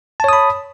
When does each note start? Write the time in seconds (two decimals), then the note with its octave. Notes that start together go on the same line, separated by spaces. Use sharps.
0.20 A5
0.24 C#5
0.29 D#6
0.33 B5